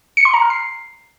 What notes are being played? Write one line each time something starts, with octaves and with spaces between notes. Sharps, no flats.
C#7
C6
A#5
F6
C7